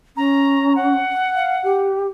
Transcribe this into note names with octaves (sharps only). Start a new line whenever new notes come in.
C#4 A#5
F#5
F5
G4